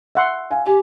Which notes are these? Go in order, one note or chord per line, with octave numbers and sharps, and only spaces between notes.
E5 F#5 C6
F5 G#5
G4 G#5